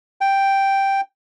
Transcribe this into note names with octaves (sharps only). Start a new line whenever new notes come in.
G5